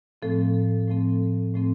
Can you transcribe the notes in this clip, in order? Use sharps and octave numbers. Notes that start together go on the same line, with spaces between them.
A2 F3 A3 C4 A4
A2 F3 A3 C4 A4
A2 F3 A3 C4 A4